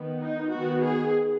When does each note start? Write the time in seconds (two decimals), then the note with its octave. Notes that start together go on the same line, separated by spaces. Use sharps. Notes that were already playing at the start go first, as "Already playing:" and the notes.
Already playing: D#3 B3
0.21 D#4
0.52 D#3 B3 F#4
0.83 G#4